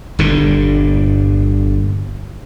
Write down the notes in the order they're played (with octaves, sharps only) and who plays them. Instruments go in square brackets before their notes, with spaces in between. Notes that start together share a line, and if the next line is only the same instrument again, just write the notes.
[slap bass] G1 G2 A#2 D3